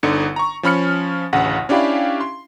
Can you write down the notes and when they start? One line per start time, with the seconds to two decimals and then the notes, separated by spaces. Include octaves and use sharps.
0.03 G1 D3 D#4 C#7
0.36 A#5 C#6
0.63 F3 C#4 B5 F6 C#7
1.33 A1 D2 C#3 F#5
1.69 C#4 D4 E4 G4 F5 B5
2.21 C6